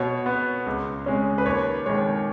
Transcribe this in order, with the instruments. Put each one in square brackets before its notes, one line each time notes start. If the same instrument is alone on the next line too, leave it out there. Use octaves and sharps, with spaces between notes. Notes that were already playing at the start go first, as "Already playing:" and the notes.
Already playing: [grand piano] B2 C#5
B3
C#2
C#3 G#3 C#4
B4
D#2 C#5
D#3 G#3 C#5